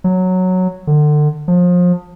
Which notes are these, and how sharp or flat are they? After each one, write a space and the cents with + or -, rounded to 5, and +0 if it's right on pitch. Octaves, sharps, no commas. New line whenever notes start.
F#3 -5
D3 +30
F3 +30